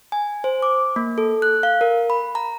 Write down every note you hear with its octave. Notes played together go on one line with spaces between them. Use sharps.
G#5
C5
D6
A#3
A4
F#6
F5
A#4
B5
A#5